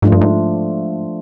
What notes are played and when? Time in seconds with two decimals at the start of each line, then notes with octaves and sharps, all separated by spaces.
0.02 G#2 F3 A3 D4 F4
0.12 G2
0.21 G#2